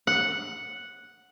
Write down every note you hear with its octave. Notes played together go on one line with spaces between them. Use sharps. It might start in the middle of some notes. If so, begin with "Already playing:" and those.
F#5